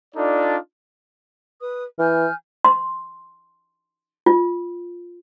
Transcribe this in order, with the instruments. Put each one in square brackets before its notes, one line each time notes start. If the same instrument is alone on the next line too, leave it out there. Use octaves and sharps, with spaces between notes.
[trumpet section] D4 D#4 F4 A4 D5
[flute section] B4 D#6
[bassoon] E3 [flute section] G#5 F6 G6
[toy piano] C6
F4